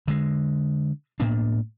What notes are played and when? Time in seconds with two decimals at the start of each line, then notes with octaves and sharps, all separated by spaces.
0.08 D3 G#3
1.20 A2 A#3 B3 D4